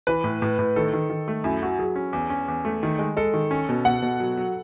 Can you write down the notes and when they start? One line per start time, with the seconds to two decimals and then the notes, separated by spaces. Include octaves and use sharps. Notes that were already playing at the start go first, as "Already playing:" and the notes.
0.07 E3 B4
0.24 A2
0.42 A2
0.59 A2
0.76 D#3 A4
0.93 D#3
1.10 D#3
1.28 A3
1.44 F#2 E4
1.62 F#3 F#4
1.79 F#3 G#4
1.96 C#4
2.13 E2
2.30 C#4
2.48 E2
2.65 A3
2.83 D#3
2.99 G#3
3.17 G#3 A4
3.34 D#3
3.51 C#4
3.69 B2
3.85 B2 F#5
4.02 B2
4.20 F#3
4.37 F#3